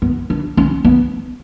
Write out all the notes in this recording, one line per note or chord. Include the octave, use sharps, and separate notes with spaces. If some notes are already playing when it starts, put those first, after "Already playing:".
B3
D4
C#4
B3